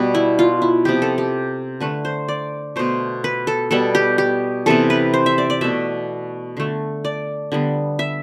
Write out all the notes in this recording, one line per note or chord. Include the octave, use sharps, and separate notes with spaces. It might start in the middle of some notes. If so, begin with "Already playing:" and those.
Already playing: B2 G3 B3
E4
F4
E4
C3 F3 B3 G4
A4
G4
D3 A3 B4
C5
D5
B2 A3 C5
B4
A4
B2 G3 B3 A4
G4
G4
C3 E3 B3 A4
B4
C5
E5
D5
D5
B2 A3 E5
D3 A3
D5
D3 G3 B3
E5